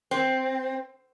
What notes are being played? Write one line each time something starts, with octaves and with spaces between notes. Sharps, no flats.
C4